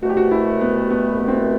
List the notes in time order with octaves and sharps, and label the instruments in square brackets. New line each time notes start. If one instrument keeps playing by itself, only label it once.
[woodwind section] C2 B2 A3 [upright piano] F#4
[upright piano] G4
F#4
E4
B3
B3
B3
C4
B3